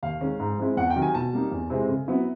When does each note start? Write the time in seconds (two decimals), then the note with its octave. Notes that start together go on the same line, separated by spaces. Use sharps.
0.03 D#2 F5
0.21 D#3 G#3 C#4
0.40 G#2
0.58 F3 G#3 C4 E4
0.77 E2 F#5
0.90 G5
0.96 C3 D#3 F#3
1.02 G#5
1.14 B2 A5
1.33 G3 A#3 D#4
1.52 E2
1.70 C3 E3 G#3 C4
1.89 C#3
2.08 F#3 B3 E4